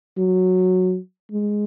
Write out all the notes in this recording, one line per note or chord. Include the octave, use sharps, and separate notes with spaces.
F#3
G#3